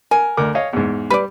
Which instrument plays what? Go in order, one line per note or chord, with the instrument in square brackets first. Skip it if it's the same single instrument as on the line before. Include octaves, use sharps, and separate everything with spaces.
[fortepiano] A#4 [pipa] G#5
[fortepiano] D2 A#4 D6
C#5 D#5 F5
E2 G#2
[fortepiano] G3 [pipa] B4 D5